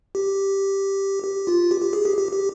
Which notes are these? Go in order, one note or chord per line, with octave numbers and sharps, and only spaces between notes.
G4
G4
F4
G4
G4
G#4
G4
G4
G4